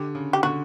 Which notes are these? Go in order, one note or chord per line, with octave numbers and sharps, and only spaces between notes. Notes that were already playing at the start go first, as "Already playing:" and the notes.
Already playing: D3 G4
C#3
G4
D3 F#4